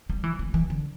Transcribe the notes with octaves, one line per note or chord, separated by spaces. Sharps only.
G3
E3
G3
E3
D3